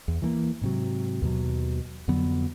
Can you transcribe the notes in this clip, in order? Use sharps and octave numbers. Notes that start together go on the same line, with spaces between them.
E2
E3 A3 A#3
G#2 C3 F#3
D#2 B2 F#3
F2 D3 F#3 B3